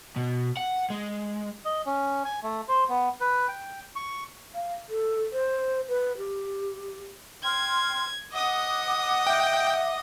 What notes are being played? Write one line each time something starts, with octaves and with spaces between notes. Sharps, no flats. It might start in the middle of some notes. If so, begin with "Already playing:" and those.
B2
F#5
G#3
D#5
C#4
G#5
A3
C5
B3
B4
G5
C#6
F5
A4
C5
B4
G4
G5 C6 F6 G#6
D#5 F#5 D6 D#6
E5 G5